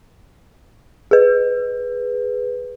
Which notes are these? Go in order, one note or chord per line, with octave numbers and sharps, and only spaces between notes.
G#4 B4